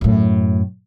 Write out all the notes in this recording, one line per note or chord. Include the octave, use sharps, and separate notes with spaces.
F#2 A2